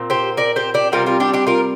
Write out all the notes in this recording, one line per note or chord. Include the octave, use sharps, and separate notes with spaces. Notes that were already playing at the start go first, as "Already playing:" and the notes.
Already playing: A#2 C4
G4 C5
A#4 D5
G4 C5
D4 G4
C3 G3 C4 F4 A#4
F4 A#4
D4 G4
D4 G4
F4 A#4